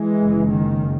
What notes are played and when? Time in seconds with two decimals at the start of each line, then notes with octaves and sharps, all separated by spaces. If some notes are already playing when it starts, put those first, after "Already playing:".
Already playing: E3 G#3
0.20 F#1 F#2 C#3
0.49 D#3